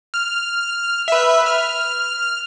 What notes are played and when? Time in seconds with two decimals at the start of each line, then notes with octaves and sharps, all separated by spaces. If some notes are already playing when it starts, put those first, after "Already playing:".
0.14 F6
1.08 B4 E5
1.46 F6